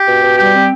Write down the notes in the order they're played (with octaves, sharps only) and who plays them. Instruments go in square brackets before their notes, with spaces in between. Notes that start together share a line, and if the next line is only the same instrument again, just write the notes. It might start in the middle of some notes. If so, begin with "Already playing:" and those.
Already playing: [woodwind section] G4
B2
B2
G3 G4
C4